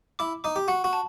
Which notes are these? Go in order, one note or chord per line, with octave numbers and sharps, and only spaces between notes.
E4 D6
D#4 D6
G4
F#4 F#5
F#4
A5